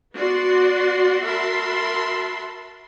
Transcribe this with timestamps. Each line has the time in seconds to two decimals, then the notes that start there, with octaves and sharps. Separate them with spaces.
0.14 B3 F#4 D5 C6
1.23 F#4 A#4 E5 A5 B5 C6